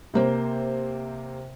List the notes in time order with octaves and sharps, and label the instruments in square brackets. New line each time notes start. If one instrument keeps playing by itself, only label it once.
[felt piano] C3 A#3 C5